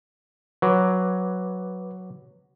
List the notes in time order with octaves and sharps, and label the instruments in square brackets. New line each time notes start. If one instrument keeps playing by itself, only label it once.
[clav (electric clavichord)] F#3 [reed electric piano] B4 D6